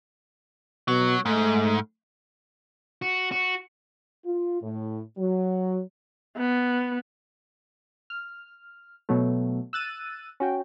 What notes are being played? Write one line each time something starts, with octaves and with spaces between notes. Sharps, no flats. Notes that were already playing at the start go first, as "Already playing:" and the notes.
B2 F#3
G#2 A3
F#4
F#4
F4
A2
F#3
B3
F6
B2 F#3 A3
E6 F#6 A6 D#7
C#4 F#4 G5